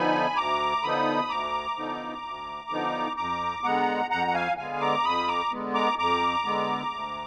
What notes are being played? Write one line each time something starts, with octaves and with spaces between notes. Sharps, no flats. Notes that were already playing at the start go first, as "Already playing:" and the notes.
Already playing: D3 F3 B3 D#4 G#5 B5
D2 A#5 D6
D3 F3 B3 D#4 B5 D#6
D2 A#5 D6
D3 F3 B3 D#4
D2
D3 F3 B3 D#4
F2 A#5 D6
D3 G#3 B3 F#5 A#5
F2 F#5 A#5
F#5
F5 G#5
D3 G#3 B3 F5 G#5
A#5 D6
F2 B5 D#6
A#5 D6
D3 G#3 B3
A#5 D6
F2 A#5 D6
D3 G#3 B3
D2